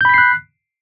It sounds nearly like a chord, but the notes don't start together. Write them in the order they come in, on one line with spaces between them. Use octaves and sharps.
G6 B5 B6 C7 F#6